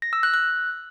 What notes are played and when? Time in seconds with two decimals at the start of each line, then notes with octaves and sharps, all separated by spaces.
0.02 A#6
0.13 E6
0.23 F#6
0.34 F#6